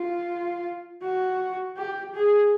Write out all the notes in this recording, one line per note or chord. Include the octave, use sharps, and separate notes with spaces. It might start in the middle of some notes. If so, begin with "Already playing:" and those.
Already playing: F4
F#4
G4
G#4